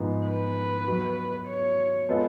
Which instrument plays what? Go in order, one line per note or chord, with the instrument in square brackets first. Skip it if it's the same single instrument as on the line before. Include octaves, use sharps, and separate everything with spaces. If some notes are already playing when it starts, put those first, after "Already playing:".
Already playing: [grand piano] G#2 F3 G#3 B3 F4
[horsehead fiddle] B4
[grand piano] F#3 B3 F#4
[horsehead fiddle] C#5
[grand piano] G#3 B3 F4 A4